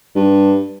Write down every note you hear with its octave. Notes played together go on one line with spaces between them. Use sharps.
G2